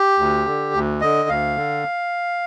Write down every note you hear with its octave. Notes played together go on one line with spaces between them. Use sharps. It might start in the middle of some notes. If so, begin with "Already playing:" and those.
Already playing: G4
D2
D3
D2
D3 D#5
D2 F5
D3